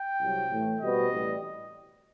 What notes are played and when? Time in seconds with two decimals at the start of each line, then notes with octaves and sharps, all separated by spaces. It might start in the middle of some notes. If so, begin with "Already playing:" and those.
Already playing: G5
0.20 C2 C3 F#3
0.50 A2 E3 A3
0.81 B2 G3 C4 F#4 B4 D#5
1.12 A1 A2 G3